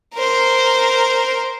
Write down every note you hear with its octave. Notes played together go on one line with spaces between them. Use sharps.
A#4 C5